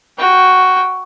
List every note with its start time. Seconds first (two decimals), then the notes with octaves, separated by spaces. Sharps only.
0.18 F#4 G5